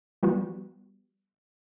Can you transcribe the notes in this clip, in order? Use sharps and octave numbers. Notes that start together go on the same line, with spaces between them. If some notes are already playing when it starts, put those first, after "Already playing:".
F3 G3 B3 F#4